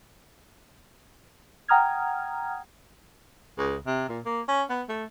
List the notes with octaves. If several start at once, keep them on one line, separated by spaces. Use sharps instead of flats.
F#5 G5 A#5 D#6 F6 G#6
C#2
C3
A#2
A#3
C#4
B3
A3